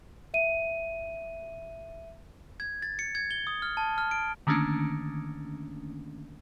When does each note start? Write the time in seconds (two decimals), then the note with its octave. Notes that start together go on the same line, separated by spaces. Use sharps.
0.34 E5 D#7
2.60 G#6
2.82 A6
2.99 C#7
3.15 G#6
3.31 G7
3.47 D#6
3.62 F6
3.77 A5
3.98 F6
4.11 D7
4.47 D3 D#3 A3 A#3 C#4 D4